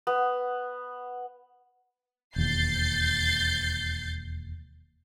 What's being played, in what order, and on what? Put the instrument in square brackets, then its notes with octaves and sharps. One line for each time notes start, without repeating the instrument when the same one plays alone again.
[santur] B3
[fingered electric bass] E1 D#2 [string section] G6 A6 C7